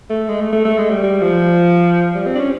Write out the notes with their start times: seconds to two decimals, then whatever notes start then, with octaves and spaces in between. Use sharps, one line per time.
0.10 A3
0.28 G#3
0.40 A3
0.53 A3
0.65 A3
0.78 G#3
0.90 G3
1.03 G3
1.21 F3
2.15 G3
2.27 C4
2.35 D4
2.39 C#4